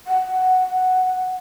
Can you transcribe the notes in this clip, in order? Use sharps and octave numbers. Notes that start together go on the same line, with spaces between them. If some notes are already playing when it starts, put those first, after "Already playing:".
F#5